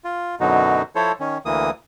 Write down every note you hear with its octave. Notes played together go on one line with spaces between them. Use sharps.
F4
F#2 B2 D3 F#3 D#4 F#4
F3 E4 A4 C5 C#5
D#3 C#4
D2 E3 A#3 D#6